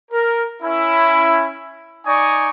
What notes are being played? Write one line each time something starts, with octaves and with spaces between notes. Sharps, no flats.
A#4
C#4 E4
D#4 D5 G#5 C#6 D#6